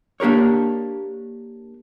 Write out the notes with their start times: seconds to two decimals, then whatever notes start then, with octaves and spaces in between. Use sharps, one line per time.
0.20 A#3 D4 G4 A#4 C#5